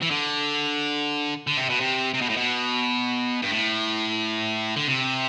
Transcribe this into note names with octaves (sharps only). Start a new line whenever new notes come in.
E3
D3
D3
C3
B2
C3
C3
B2
A2
B2
G2
A2
D3
C3